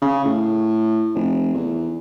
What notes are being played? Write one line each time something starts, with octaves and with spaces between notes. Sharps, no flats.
C#3
A2
F1
E2